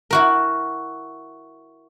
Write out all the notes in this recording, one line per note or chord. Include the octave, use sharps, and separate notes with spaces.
E4 F#4 A#4